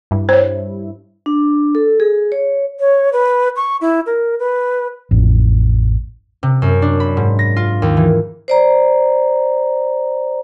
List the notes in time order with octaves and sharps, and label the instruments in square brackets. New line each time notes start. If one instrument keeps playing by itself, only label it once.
[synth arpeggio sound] G2 E4
[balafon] C5 C#5
[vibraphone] D4
A4
G#4
C#5
[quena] C#5
B4
C#6
E4
A#4
B4
[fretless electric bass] A1 F2
[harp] C3
F#2
D4
B5
G#2
A#6
F4
D#2
E3
[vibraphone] C5 D5 A#5